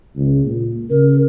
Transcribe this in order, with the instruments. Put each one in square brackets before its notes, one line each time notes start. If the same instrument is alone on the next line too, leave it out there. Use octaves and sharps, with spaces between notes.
[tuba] C#2
A#2
[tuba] C#3 [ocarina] A#4